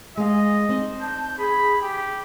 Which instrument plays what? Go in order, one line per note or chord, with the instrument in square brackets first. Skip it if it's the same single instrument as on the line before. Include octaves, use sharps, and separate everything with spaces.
[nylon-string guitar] G#3 F5 [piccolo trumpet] D#5 [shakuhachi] G#5
[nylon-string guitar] C4 D#4
[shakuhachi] A5 [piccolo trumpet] G6
[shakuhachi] G#4 [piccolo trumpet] B5
[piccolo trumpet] G4